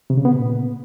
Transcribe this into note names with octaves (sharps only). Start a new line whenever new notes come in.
C3
C#3
B3
A#2